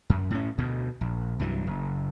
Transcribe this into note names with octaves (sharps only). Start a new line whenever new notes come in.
F#2
A2 C#4
D2 B2
A#1
C2 G2 E3 F#3
F#1